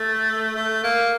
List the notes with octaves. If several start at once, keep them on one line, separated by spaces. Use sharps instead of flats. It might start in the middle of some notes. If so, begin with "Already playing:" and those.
Already playing: A3
A3
A#3